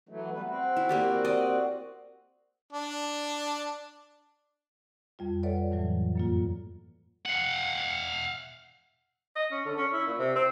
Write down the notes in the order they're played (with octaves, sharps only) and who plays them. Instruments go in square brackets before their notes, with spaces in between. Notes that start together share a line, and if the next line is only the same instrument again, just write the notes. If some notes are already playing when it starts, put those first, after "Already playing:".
[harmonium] E3 F#3 A3
G3 B3 B4
C4 F#4
[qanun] E4
A#3 G4 D5
D5 D#5
[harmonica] D4
[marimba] F2 G3 F4
A4 B4 C#5 D5 E5 F#5
F2 A2 E3 F#3
F#2 A#3 F4
[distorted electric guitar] F5 F#5
[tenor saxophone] D#5
C#4
D3
C#4
E4
A#2
C3
C4